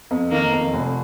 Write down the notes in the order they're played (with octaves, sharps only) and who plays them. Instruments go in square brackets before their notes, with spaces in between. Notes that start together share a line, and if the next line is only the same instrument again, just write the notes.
[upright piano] F2
[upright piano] D#3 [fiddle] A#3
[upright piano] F2
F1